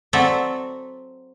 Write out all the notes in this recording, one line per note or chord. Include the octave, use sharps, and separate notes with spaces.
F#3 C4 A4 D5 E5